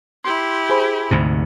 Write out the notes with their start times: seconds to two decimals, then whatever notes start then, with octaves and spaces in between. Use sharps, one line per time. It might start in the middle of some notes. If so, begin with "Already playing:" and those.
0.25 E4 G4 C6
0.70 G#4 C5 B5
1.11 D2 G#2 C3